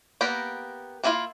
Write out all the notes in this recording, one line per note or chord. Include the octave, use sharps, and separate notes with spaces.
A#3 B3 G4 A#4
A#3 D4 E4 F4 F5